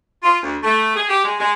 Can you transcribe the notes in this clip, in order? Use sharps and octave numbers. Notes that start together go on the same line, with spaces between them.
F4
D2
A3
G#4
G4
G#3
G#3